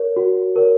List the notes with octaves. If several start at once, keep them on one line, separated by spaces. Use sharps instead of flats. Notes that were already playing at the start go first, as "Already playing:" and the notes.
Already playing: A#4 C#5
F#4
A#4 C#5